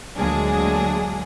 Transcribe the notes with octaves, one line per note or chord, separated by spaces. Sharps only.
D2 F#3 G#3 A#3 D4 G#4